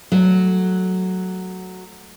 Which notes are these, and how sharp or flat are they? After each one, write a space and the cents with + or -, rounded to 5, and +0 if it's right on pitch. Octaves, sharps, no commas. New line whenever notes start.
F#3 +0 A3 +0